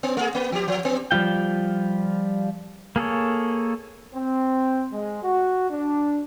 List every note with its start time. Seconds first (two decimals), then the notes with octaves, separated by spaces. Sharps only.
0.03 B3
0.17 A3 G#4
0.35 A#3
0.52 F3 G4
0.68 F3
0.85 B3
1.11 F3 G3 F4 G5
2.96 A#3 G#4 A4 C#5
4.14 C4
4.93 G#3
5.23 F#4
5.70 D4